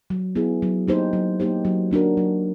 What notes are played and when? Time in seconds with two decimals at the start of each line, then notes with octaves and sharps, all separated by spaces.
0.10 F#3
0.35 B3 E4 G#4
0.62 F#3
0.87 A#3 D#4 G4 C5
1.13 F#3
1.40 A#3 D#4 G4 C5
1.65 F#3
1.91 A#3 D4 F#4 A#4
2.17 F#3